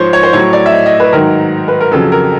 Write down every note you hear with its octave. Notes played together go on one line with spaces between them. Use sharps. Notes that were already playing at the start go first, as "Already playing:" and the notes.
Already playing: G#2 F3 C5 C#5
C#5
C5
A2 F#3 C#5
D5
E5
D#5
D#5
B4
G#2 D#3 F#3 A#4
B4
A#4
F2 C#3 F#3 A4
A#4